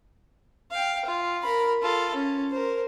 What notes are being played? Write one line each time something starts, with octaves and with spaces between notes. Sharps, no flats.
F5 G5
F4
A#4 B5
F4 A4
C#4
A#4 C5